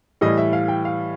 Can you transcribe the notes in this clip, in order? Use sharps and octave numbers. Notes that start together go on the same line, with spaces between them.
A2 E3 G3 D#5
E5
F5
G5
F5